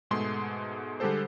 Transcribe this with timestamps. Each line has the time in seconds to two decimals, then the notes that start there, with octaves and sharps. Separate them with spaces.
0.11 G#2 B2 G#3 A3 C6
1.00 D3 G3 G#3 G4 A4 C5